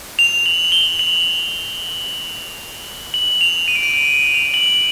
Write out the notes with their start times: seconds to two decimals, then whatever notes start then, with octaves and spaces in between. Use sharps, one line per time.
0.19 F7
0.46 F#7
0.65 F#7
0.72 G7
0.99 F#7
3.14 F#7
3.41 F7
3.68 D#7
3.75 D7
3.83 D#7
3.94 D#7
4.34 F7
4.54 F#7
4.74 F#7